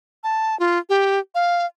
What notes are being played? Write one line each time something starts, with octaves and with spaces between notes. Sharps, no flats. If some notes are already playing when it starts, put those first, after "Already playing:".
A5
F4
G4
F5